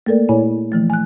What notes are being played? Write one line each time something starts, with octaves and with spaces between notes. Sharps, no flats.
A3 A#3 A4 A#4 D5
A#2 E4 C#5 G#5
E3 F3 A3
G#5 F#6